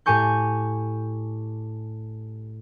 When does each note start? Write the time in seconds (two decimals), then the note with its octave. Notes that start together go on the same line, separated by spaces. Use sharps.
0.06 A2 G4 G#5 C#6 G6